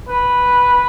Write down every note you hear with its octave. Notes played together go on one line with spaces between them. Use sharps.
B4